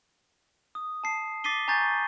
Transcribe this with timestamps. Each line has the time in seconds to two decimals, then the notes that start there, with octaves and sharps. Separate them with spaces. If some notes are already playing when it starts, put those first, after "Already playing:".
0.75 D#6
1.04 A5 C7
1.44 D6 A6 B6 C7 D#7 G7
1.68 G#5 A#5 C#6 G6 A6